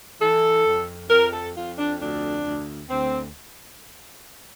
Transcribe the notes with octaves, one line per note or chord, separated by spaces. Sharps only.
E3 A4
F2
F2 A#4
A4
F2 F4
D4
D2 D4
D2
D2 C4